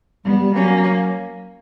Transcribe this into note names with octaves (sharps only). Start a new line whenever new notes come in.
G3 B3
G3
F#3 A#3 C#4